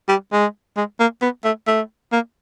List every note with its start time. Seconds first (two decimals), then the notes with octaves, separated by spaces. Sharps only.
0.08 G3
0.32 G#3
0.77 G#3
1.00 A#3
1.22 B3
1.45 A3
1.67 A3
2.12 A#3